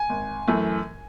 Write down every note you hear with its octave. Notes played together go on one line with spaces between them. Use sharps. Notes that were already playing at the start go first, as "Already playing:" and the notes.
Already playing: G#5
G#1
F#2 E3 A3